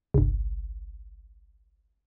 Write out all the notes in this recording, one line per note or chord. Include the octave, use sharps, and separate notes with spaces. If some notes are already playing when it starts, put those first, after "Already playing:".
G1 C2